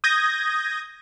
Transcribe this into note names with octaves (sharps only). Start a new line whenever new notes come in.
D#6 G6 G#6 A#6